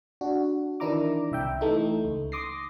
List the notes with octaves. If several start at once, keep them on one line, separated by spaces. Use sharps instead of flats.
D4 F#4
D#3 E3 D4 E4 A#5 D6
C2 E5 G5
E3 A3 D#4
C#2
C6 D6 D#6 A#6 C7